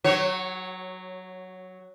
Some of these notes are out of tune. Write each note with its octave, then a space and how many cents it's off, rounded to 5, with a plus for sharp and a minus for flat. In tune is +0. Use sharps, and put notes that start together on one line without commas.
F#3 +0 F#4 +40 C#5 -10